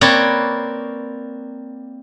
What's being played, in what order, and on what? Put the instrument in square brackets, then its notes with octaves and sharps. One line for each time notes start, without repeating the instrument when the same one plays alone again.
[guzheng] A#3 C4 B4 C#5 D5